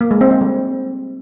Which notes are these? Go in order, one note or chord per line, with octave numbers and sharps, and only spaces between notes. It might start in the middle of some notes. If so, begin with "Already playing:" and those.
A#3
G#3
C4
C4
G3